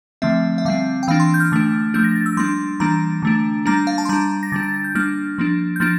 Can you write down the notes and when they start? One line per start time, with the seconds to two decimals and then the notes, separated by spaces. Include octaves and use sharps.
0.22 D3 F3 A3 C4 E5
0.58 E5
0.65 D3 G3 C4 F5
1.03 G5
1.08 E3 A#3 D4 F5
1.20 C6
1.34 G6
1.40 F6
1.52 D3 A3 D4
1.94 F3 A3 D4 G6
2.04 A#6
2.16 A6
2.26 E6
2.37 G3 A#3 D4 C6
2.80 E3 G3 A#3 D4 A#5
3.22 D3 A3 D4
3.66 G3 A#3 D4 A#5
3.87 F5
3.98 A5
4.05 C6
4.09 G3 D4 A#5
4.43 A#6
4.52 D3 G3 D4 A6
4.63 A6
4.74 A6
4.84 G6
4.95 G3 A#3 D4 F6
5.38 F3 A#3 D4
5.76 G6
5.80 F3 A#3 D4 A6